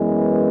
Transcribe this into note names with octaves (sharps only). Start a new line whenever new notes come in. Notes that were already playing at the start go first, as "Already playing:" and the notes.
Already playing: F#2 E3 G#3 B3